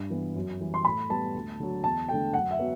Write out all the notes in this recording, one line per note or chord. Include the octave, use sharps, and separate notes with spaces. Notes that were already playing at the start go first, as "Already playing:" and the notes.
Already playing: G2
E3 B3
F#2
E3 G3
C6
A2 B5
G3 B3 A5
D2
D3 F#3
E2 A5
D3 A3 G5
F#2 F#5
E5
F#3 B3